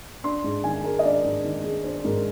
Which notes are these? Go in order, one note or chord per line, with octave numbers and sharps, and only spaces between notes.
D4 C6
G#2
D#3 G#5
G#3 A#4
D#5
D4 D5
G#2
D#3
G#3
D4 C5
G#2 A#4